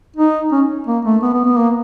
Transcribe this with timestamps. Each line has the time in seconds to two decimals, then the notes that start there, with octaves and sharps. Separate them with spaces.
0.16 D#4
0.52 C#4
0.87 A#3
1.05 A3
1.22 B3
1.33 B3
1.45 B3
1.57 A#3